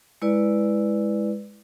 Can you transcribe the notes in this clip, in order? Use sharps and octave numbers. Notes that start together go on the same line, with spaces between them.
G#3 E4 B4 D5